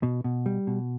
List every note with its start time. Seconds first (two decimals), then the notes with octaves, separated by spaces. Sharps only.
0.03 B2
0.24 B2
0.46 G3
0.67 B2